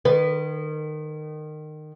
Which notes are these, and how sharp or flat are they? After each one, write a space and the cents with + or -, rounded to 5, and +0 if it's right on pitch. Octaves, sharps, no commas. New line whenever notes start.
D#3 -25 B4 +10